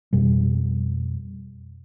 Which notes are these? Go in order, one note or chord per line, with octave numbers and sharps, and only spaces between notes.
F2 B2 G3